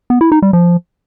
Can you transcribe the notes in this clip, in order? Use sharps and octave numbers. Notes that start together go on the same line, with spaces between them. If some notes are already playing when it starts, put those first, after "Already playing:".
B3
E4
D#4
G3
F3